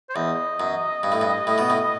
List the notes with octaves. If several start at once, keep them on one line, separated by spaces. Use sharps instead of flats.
C5
E2 D#5
F#2
G2
A2
G2
A2
B2
A2